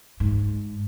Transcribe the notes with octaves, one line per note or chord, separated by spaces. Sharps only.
G#2